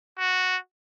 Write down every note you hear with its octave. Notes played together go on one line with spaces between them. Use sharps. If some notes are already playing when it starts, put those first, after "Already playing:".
F#4